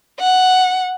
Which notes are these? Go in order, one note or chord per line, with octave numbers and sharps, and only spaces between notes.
F#5